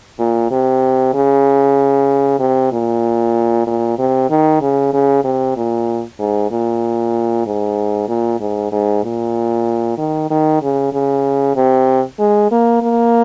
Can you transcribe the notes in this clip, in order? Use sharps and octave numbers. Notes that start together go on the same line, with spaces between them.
A#2
C3
C#3
C3
A#2
A#2
C3
D#3
C#3
C#3
C3
A#2
G#2
A#2
G#2
A#2
G#2
G#2
A#2
D#3
D#3
C#3
C#3
C3
G#3
A#3
A#3